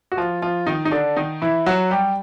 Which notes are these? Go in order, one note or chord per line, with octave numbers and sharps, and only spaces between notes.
F#4
F3 F4
F3 F4
D#3 D#4
D#4
D3 D4
D#3 D#4
E3 E4
F#3 F#4
G3 G4